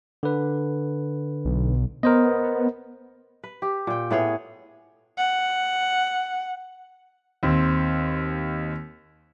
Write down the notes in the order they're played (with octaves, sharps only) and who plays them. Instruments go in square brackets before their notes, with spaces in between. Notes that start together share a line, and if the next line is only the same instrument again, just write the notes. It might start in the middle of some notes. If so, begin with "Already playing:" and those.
[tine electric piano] D3 B4
[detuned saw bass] B1
[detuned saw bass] B3 [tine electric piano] A#4 C5 D#5
[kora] B4
G4
A#2 G5
A2 B3 G#4 C#5
[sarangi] F#5
[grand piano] D#2 C4